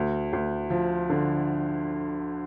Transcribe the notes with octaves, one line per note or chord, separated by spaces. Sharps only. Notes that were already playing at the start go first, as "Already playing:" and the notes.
Already playing: D2
D2
F3
D3